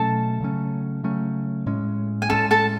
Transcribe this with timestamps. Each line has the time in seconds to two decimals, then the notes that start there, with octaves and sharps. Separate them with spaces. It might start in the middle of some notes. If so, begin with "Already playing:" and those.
Already playing: B2 F#3 A3 C#4 A4 A5
0.40 C#3 F#3 A3 C#4
1.03 C#3 F#3 A3 C#4
1.66 A2 G#3 C#4
2.22 G#5
2.29 A2 G#3 C#4 A4 A5
2.51 A4 A5